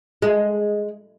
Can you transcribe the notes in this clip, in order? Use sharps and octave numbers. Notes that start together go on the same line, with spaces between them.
G#3